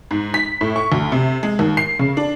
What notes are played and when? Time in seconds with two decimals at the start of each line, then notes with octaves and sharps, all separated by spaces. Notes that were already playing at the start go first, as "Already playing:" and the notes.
0.11 G#2
0.34 B6
0.61 A2
0.76 C#6
0.92 D2
1.12 C3
1.43 G#3
1.59 D#2
1.77 C7
1.99 C#3
2.17 D4